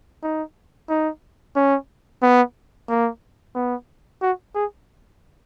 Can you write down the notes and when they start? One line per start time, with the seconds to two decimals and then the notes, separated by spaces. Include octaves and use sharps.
0.23 D#4
0.89 D#4
1.56 C#4
2.22 B3
2.89 A#3
3.55 B3
4.22 F#4
4.55 G#4